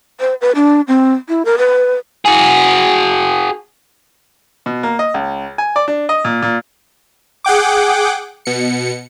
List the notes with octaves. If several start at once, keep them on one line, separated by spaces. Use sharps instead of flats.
C5
B4
D4
C4
E4
A#4
B4
F#4 G#4
B2
A#3
D#5
C#2
G#5
D5
D4
D#5
A#2
A#2
G#4 F#5 G5 D6
B2 C#7